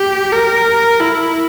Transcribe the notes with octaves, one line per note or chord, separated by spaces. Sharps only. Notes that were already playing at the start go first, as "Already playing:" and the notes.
Already playing: G4
A#4
E4